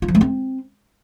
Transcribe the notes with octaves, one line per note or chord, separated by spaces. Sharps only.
F4
F3
A3
C4